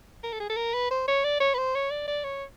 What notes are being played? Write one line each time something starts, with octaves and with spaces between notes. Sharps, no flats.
A#4
A4
G#4
A4
A#4
B4
C5
C#5
D5
C#5
B4
C5
C#5
D5
D5
C#5